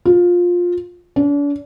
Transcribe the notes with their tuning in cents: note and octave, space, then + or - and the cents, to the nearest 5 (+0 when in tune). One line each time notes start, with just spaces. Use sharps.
F4 +15
D4 -40